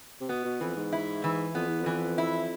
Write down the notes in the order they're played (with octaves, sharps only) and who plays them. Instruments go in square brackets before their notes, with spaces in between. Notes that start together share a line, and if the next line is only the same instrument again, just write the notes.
[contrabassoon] C3
[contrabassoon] B2 [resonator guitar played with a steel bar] B3
[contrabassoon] B2
[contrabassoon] F2 [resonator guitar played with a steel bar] E3
[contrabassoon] G#2
[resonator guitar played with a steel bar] E4
E3
[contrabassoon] F2 [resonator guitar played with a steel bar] B3
[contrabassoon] E2
F2
[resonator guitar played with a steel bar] E3
E4